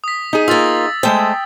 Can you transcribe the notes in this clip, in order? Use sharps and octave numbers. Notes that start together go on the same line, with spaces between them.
D#6 B6
D#4 G#4
A#3 F4 E6 A6
G#3 A3 C5 G5